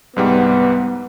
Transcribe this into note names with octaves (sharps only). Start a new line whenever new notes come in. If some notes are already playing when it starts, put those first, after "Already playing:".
C2 G#2 G3 B3